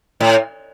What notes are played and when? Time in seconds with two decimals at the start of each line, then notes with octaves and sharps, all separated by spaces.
0.20 A2